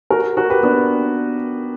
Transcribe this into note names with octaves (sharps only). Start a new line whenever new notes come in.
F#4 A#4
F#4 A#4
G4 B4
B3 D4